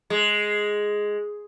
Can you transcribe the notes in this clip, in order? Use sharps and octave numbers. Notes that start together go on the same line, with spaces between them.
G#3